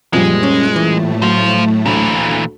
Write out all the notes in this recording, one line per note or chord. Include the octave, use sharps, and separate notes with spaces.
F#1 A#2 F3 G3 G#3
C#4 F#6 C#7
A2 E3 A3
F#3 F4 C5
D2 A#2 E3